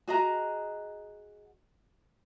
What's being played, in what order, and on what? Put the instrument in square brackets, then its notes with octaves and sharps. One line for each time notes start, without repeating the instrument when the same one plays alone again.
[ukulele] F#4 G#4 D#5 A#5